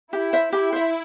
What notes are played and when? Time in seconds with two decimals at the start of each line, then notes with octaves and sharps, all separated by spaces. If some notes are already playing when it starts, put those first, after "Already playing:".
0.13 E4 G4
0.33 C5 E5
0.52 E4 G4
0.73 C5 E5